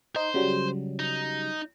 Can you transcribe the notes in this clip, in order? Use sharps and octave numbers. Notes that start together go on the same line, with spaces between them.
D#4 C5
C#3 F#3 G3
D#4